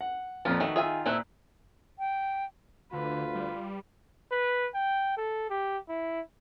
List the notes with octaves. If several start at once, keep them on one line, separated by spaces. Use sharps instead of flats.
F#5
F2 A#2 F3 B3 F4
D#3 A3 F#4 B4
D#3 F4 G#4 E5 G#5
A#2 A3 C4 E4 F#6
G5
D2 D3 F4 B4
G3
B4
G5
A4
G4
E4